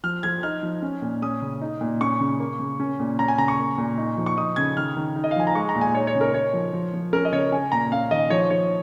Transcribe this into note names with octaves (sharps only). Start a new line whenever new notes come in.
F3 F6
F3 G#6
D#4 F6
F3
C#4
A#2
C#4 D#6
C#3
D#4
A#2
C#4 C#6
C#3
A#3
C#3
C#4
A#2
C#4 A#5
G#5
C#3 A#5
C#6
A#3
A#2
D#4
F3
C#6
D#4 D#6
C#3 G#6
D#3 F6
D#3
D#4
D#5
F5
F3 G#5
A#5
G#3 C#6
A#5
A#2
G#5
D#4 C#5
C#5
C#3
A#4
D#4 C#5
F3
F3
F3
C#4 A#4
D#5
C#3 C#5
C#4 G#5
A#2 A#5
C#4 F5
D#3 D#5
F3 C#5
F3 C#5